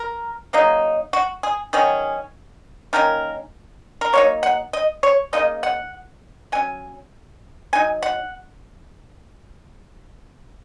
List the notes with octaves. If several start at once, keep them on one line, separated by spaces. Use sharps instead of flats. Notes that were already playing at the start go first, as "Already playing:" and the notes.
Already playing: A#4
C#3 F#3 A#3 D#4
F#4
G#4
D#3 F#3 C#4 G#4
D#3 A#3 C#4 A#4
A#4
F#3 A#3 D#4 C#5
F#5
D#5
C#5
C#3 A#3 D#4 D#5
F#5
F#3 C#4 G#5
F#3 D#4 G#5
F#5